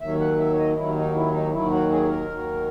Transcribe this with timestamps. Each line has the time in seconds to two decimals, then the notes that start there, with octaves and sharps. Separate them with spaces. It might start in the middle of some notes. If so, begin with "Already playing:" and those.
0.01 D#2 D#3 F#3 E5
0.20 F#5
0.39 E5
0.53 C#5
0.58 D#5
0.77 D#2 D#3 F#3 E4
0.96 D#4
1.15 E4
1.34 D#4
1.53 D#2 D#3 F#3 E4
1.71 F#4
1.91 G#4
2.10 A#4
2.28 D#2 D#3 F#3